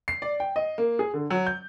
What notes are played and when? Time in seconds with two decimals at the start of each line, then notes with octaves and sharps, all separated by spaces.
0.08 C7
0.22 D5
0.40 G5
0.56 D#5
0.78 A#3
0.99 G#4
1.14 D3
1.30 F#3
1.47 G6